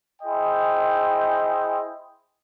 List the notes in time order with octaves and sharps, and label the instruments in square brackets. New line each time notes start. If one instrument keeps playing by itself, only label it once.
[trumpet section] E4 G#4 C5 D#5 G5